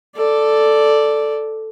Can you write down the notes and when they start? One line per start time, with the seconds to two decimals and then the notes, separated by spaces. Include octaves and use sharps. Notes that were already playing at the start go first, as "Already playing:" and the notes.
0.16 A4 D5